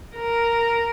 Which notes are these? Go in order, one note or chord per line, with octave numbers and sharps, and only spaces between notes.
A#4